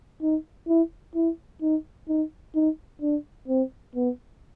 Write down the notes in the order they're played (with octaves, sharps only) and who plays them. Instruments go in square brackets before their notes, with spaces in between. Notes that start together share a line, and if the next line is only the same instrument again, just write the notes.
[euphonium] D#4
E4
E4
D#4
D#4
D#4
D4
C4
B3